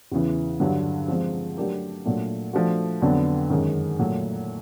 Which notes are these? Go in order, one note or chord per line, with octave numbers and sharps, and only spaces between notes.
E2 C#3 E3
G2 D3 F#3
F3 G#3 C4
F#3 A3 D4 G4 A#4
A#2 F#3 A3 D4
F3 A3 D4 F#4
F2 D3 F#3 B3 D4
F#2 D#3 G#3
A#2 F#3 A3